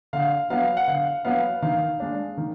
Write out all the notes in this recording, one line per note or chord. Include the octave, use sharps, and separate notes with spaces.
D3 F5
F#3 B3 F5
F#5
D3 F5
F#3 B3 F5
D#3 F5
G#3 D4
D#3